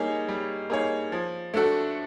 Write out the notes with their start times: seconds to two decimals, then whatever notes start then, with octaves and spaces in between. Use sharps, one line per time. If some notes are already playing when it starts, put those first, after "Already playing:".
Already playing: G3 A#3 D#4 G#4 C#5
0.29 G3
0.70 A#3 D#4 G#4 C#5
1.12 F3
1.54 A3 D4 F#4 A4